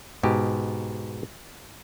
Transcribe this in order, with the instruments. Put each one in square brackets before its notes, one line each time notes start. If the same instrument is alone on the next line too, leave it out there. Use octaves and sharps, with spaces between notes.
[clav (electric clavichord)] G#2 B2 G4